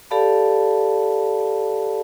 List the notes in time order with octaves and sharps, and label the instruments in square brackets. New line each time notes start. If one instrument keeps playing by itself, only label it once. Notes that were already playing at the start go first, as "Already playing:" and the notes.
[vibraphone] G4 A4 D5 F5 A5 B5